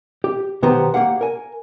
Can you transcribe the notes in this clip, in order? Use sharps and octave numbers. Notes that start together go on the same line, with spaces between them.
G4
B1 D#3 B3 G4 C5 A#5
A3 A#3 G4 F5 F#5
A#4 G#5